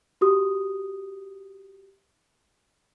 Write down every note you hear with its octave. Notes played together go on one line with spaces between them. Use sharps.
F#4 G4 D#6